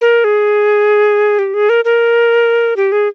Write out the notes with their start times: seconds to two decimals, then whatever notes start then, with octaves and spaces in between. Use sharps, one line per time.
0.01 A#4
0.24 G#4
1.39 G4
1.54 G#4
1.69 A#4
1.85 A#4
2.76 G4
2.92 G#4